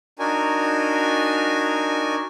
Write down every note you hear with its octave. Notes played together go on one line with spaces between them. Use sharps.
D4 D#4 F#4 A#4 G#5